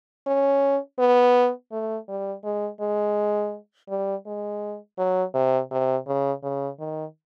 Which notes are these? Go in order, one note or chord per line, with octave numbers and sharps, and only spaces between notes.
C#4
B3
A3
G3
G#3
G#3
G3
G#3
F#3
C3
C3
C#3
C#3
D#3